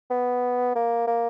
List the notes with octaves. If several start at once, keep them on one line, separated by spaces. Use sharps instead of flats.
B3
A#3
A#3